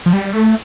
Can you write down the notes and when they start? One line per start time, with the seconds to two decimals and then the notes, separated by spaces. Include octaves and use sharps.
0.06 F3
0.13 G3
0.33 A3